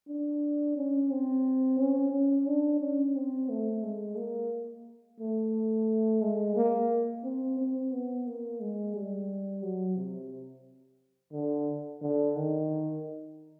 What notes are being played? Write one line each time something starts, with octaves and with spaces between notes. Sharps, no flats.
D4
C#4
C4
C#4
C#4
D4
C#4
C4
A3
G#3
A#3
A3
G#3
A#3
C4
C4
B3
A#3
G#3
G3
F#3
C3
D3
D3
D#3